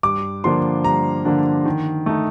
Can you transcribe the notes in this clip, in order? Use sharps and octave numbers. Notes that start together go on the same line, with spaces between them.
G2 D6
D3 F3 A#3 D4 C6
G2 A#5
D3 F3 A#3 D4
D#3
A3 D#4